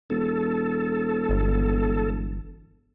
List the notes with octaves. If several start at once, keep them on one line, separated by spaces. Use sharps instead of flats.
E1 A4
G1